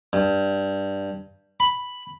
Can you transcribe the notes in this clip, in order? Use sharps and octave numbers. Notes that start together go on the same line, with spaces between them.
G2
B5